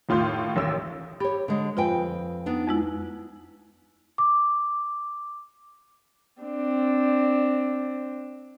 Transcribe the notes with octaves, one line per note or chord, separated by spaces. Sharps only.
D#2 A2 F4 C6 G6
A1 D#2 E6
G4 C#5 B5
D3 G#3
F2 F4 B4 G5 G#5
B3 D4 D#4
F2 G#3 E4
D6
C4 D4